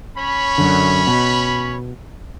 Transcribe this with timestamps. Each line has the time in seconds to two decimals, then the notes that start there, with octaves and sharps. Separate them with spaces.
0.17 C#4 C#5 B5
0.58 F#2 D3
1.07 B2